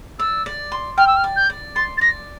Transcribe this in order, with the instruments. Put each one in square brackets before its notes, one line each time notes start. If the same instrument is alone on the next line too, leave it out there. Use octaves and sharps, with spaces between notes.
[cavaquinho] D5 [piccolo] E6
[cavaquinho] D5
C6
[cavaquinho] G5 [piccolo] F6
[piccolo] E6
F6
[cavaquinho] D5
[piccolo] G6
[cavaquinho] D5
[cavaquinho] C6 [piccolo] A6
[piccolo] A6
[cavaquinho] D5 [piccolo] A#6